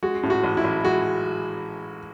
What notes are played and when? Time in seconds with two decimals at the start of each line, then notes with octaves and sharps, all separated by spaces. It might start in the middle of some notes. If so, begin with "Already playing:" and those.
0.03 G#3 F#4
0.23 A2
0.30 F#4
0.43 A1
0.57 E4
0.64 A1
0.84 G#3 F#4